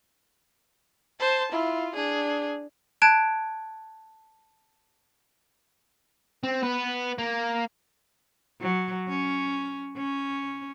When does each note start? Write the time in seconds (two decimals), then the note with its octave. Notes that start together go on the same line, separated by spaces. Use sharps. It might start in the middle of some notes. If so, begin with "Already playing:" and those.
1.20 C5 A5
1.52 E4 F4
1.96 D4 G#4
3.02 A5 F#6 G#6 D7
6.43 C4
6.63 B3 B4
7.18 A#3
8.61 F#3
9.09 C#4
9.97 C#4